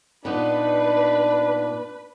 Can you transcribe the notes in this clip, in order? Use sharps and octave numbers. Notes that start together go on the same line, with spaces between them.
A#2 B3 D4 D#4 B4